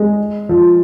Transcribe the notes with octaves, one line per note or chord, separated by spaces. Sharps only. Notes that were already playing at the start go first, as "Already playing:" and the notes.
Already playing: G#3
F3